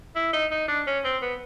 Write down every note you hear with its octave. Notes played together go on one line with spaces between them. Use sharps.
E4
D#4
D#4
D4
C#4
C4
B3